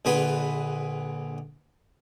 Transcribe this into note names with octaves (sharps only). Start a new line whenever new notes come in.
A#1 D3 G#4 B4 B5 C6